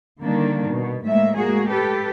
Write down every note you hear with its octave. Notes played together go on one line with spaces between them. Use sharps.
D3 D#3 G3 A#3 D4
B2
A2 G#3 A#3 E5
G#3 A#3 F#4 G#4
G4 A4 B4